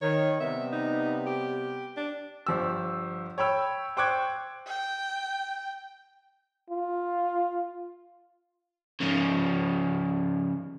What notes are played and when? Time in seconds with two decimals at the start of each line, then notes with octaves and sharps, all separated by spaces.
0.02 D#3 C#5
0.40 C3 G3 B3 E5
0.73 D#4
1.26 G4
1.96 D4
2.47 G1 F3 G4 E6
3.38 C#5 G5 B5 E6
3.97 C5 G5 C#6 D6 F#6 G#6
4.67 G5
6.70 F4
9.00 C#3 F3